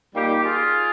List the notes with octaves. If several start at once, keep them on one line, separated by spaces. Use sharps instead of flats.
A#2 G3 A#3 D#4 G4
F4 G#4